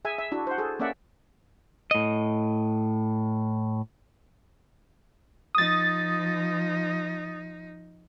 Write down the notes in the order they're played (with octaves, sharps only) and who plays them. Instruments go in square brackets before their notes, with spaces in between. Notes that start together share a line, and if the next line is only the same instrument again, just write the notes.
[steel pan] G#4 E5 G#5
E5
D4 E4 F#4
C5 F#5
G#4 A4
A#3 C#4 D5 E5 F#5
[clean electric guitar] A2 D#5
[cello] F3 D#4 [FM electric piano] D#6 A6